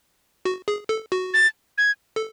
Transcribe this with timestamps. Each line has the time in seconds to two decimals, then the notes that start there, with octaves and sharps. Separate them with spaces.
0.45 F#4
0.68 G#4
0.89 A4
1.12 F#4
1.34 A6
1.78 G#6
2.16 A4